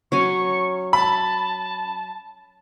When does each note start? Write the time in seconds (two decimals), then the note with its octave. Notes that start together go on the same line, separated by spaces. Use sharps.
0.12 F#3 C#4 G#5 C#6
0.93 A5 B5